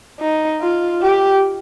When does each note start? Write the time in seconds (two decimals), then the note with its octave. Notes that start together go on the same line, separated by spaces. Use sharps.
0.20 D#4
0.61 F4
1.01 G4